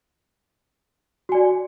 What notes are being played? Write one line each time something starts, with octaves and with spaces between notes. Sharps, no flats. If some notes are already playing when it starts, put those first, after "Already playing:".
F#4 D5 G#5